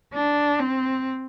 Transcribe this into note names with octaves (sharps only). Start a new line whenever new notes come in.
D4
C4